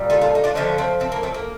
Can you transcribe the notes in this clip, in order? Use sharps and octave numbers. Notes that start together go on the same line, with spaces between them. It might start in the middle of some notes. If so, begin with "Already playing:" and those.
Already playing: A#2 G3
F4 A4
F4 A4
D#4
D4 F4
D3 F3 A3 C4 D#4
A3 C4
A3 C4
A#3
A3 C4
A#3